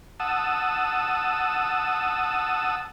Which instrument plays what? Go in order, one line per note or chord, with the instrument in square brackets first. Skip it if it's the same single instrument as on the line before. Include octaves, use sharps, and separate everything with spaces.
[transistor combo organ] F#5 A5 D#6 E6